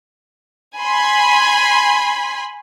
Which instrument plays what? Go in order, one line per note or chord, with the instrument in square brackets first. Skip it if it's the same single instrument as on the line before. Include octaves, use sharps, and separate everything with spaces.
[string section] G#5 B5 C6